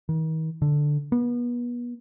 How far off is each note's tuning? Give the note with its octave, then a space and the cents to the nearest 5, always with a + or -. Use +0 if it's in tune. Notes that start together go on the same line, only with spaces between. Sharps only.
D#3 +40
D3 +5
B3 -35